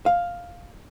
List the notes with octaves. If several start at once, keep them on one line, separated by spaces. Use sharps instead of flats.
F5